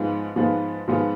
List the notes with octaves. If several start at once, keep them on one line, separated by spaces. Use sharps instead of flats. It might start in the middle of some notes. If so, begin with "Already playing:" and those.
Already playing: G#2 F3 G#3 B3 F4
G#2 F3 G#3 B3 F4
G#2 F3 G#3 B3 F4